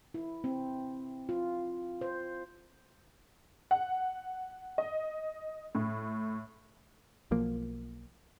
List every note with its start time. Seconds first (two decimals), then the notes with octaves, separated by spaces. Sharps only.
0.14 E4
0.44 C4
1.29 F4
2.01 C5
3.71 F#5
4.78 D#5
5.75 A2
7.31 B1 F3 A#3